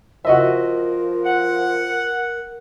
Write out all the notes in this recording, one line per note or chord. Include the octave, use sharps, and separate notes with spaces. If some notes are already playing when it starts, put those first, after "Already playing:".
F3 F#4 A#4 D#5 E5
F#5